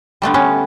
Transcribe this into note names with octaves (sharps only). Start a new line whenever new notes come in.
D3 G3 A3 B3
B3 C#4